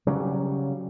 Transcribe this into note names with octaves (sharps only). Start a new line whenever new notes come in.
C#3 F#3 G3